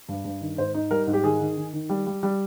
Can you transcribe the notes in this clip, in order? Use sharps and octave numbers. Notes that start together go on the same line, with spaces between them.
G2
G2
D#3
G#2 C5
D#4
G3 A#4
G#2
G4
D#3 G#4
D#3
D#3
D#3
G3
G3
G3